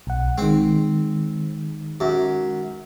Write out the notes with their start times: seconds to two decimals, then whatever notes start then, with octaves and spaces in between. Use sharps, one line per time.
0.07 B1 F#5
0.38 D#3 G#3 C4
2.00 F#2